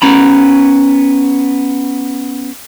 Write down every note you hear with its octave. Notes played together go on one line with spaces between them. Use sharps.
B3 C#4 A#5 B5